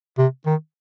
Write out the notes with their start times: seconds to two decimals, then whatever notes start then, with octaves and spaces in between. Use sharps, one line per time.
0.18 C3
0.46 D#3